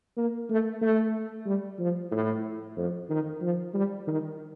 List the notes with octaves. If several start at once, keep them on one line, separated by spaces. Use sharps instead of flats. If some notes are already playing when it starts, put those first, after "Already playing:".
A#3
A3
A3
G3
F3
A2
F2
D#3
F3
G3
D#3